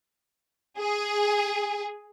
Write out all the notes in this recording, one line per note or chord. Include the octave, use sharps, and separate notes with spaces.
G#4